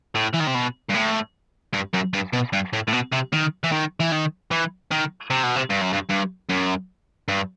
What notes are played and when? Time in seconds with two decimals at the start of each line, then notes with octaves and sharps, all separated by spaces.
0.15 A2
0.34 E3
0.41 D#3
0.48 C3
0.55 B2
0.90 G2
0.94 A2
1.74 G2
1.94 F#2
2.14 G2
2.33 B2
2.53 G2
2.73 A2
2.88 A2
2.93 B2
3.12 C3
3.33 D#3
3.64 E3
3.72 D#3
4.00 E3
4.12 D#3
4.51 E3
4.91 D#3
5.30 C3
5.43 B2
5.56 C3
5.70 G2
5.81 F#2
5.93 G2
6.09 G2
6.49 F#2
7.29 G2